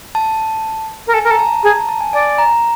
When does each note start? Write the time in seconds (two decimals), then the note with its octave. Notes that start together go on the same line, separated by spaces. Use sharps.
0.15 A5
1.07 A#4
1.14 A4 G#5
1.24 A#4
1.27 A4 A#5
1.39 A5
1.63 G#4 A#5
1.76 A5
1.89 A5
2.01 G#5
2.13 D5 G#5
2.38 A#5